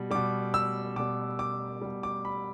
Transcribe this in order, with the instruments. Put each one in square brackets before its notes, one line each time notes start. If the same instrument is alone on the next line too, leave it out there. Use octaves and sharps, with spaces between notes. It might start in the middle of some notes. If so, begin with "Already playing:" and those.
Already playing: [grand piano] B2 G3
B2 G3 D6
E6
B2 G3 D6
D6
B2 G3
D6
B5